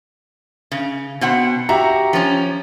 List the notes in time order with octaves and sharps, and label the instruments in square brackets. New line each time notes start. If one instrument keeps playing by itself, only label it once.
[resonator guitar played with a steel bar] C#3
B2 C4 F#5
[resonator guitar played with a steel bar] F#4 [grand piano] G4 E5 A#5
[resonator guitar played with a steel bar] F3 C#4